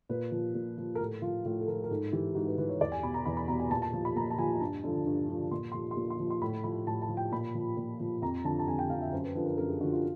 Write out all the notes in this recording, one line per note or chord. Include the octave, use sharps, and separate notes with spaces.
A#2 B4
F3
A#2
F3
A#4
A2 A4
F3 F4
A2 F4
A4
F3 A#4
A#4
G#2 A4
E3 G4
G#2 F#4
B4
E3 B4
C#5
E2 D5
G#5
B2 B5
A#5
E2 B5
B5
B2 A#5
G#5
A#2 A5
A5
F3
B5
A#2 A#5
A5
F3 G#5
G2 A5
D3 F3
G2
D3 F3
A#2 C6
F3 C6
C6
A#2
C6
F3
C6
A2 B5
F3 B5
A2 A5
A5
F3
G5
A#2 B5
F3
A#2
F3
F2 A#5
D3 F3 A5
A5
F2 G#5
G5
D3 F3 F5
E5
F#2 C5
B4
D3 F3 B4
A#4
F#2 A#4
G#4
D3 F3 F#4
F4